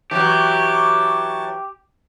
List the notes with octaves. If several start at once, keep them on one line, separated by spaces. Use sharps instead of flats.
E3 F#3 G4 C#5 A5